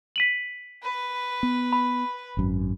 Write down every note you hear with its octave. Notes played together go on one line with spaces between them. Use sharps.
B6 D#7 F#7
B4
B3
B5
G#1 F#2